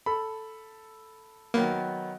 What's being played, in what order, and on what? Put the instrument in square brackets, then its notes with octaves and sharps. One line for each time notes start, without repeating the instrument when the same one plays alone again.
[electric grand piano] A4 B5
[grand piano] D#3 F#3 B3 [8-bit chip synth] A#3